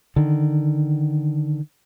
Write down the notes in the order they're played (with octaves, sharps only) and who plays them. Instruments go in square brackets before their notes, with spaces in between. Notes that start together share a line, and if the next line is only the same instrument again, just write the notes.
[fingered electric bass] D3 D#3